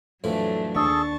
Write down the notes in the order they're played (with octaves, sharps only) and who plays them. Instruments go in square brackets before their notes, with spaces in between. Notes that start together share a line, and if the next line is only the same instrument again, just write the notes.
[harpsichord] F2 A2 E3 [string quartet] F#3 A3 D4
[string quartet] D#2 A5 C#6 [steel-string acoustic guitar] D4 [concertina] G#4 A4